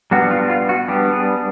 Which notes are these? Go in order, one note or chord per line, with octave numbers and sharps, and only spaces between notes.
G3 B3 D4 F#4
F4
F4
F#4
G3 B3 D4 G4
G#4